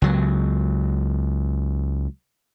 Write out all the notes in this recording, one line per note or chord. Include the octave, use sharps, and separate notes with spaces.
C#2 F#3